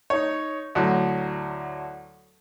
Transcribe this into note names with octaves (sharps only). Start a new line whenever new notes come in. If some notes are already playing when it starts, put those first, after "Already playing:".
D#4 C#5
D2 A2 F#3